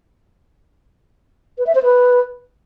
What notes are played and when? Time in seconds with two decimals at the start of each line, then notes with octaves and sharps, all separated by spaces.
1.58 B4
1.67 E5
1.75 C5
1.83 B4